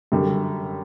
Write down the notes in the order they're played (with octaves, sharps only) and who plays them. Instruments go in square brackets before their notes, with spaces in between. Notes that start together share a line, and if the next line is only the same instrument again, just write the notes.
[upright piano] F#2 D3 G3